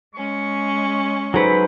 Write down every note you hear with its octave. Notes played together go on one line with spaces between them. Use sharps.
G#3 C#4 C#6
F#3 D#4 G#4 A4 B4 C5